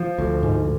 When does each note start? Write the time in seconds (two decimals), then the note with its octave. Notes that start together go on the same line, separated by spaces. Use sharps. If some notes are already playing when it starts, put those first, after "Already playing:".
Already playing: F3
0.19 D2
0.43 G#2